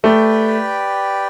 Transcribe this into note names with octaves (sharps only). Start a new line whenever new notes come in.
A3 G4 B4 D5 G5